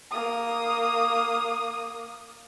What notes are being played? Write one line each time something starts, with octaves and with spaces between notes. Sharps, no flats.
A#3 D#6